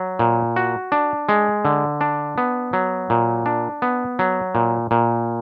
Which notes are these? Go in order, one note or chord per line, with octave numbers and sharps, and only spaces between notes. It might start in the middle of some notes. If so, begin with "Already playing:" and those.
Already playing: F#3
A#2
F#4
D4
G#3
D3
D4
B3
F#3
A#2
D4
B3
F#3
A#2
A#2